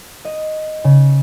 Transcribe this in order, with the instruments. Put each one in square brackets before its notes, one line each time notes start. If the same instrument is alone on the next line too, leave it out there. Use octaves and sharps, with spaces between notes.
[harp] D#5
C#3